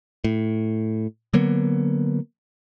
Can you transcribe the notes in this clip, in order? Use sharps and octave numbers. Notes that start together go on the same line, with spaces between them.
A2
D3 F#3 A#3 B3